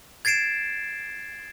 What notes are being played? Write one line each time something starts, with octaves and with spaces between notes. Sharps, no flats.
G#6 A6 C7 D7 E7